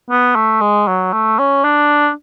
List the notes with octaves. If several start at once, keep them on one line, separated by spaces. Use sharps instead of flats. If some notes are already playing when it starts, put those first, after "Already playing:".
B3
A3
G#3
F#3
A3
C#4
D4